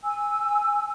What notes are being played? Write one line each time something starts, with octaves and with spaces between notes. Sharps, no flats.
G#5 E6